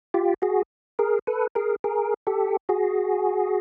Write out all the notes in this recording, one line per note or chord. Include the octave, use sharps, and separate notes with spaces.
F4 G4
F#4 G#4
G#4 A#4
A4 B4
G#4 A#4
G#4 A#4
G4 A4
F#4 G#4